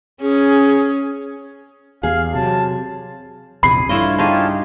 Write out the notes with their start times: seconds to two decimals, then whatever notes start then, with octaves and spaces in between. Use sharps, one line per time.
0.21 C#4 G#4
2.03 E2 G4 G#4 F5
2.35 C3 F#3 A5
3.63 A#1 E2 C3 G#4 B5 C7
3.89 G2 A3 E4 F4 C#5 D#5
4.18 D#4 F4 G4 G#4 C#5 A5